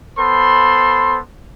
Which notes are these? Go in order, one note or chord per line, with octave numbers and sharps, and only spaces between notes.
B3 A4 C5 B5 C6